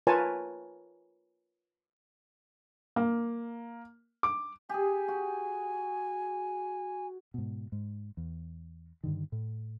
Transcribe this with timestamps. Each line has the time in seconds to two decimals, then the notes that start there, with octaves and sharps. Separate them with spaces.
0.07 F4 A#4 B4 C#5 G#5 A5
2.96 A#3
4.23 D6
4.69 G4 G#4 G#5
5.08 F#4
7.34 G#2 B2
7.72 G#2
8.17 E2
9.04 G2 D3 D#3
9.32 A2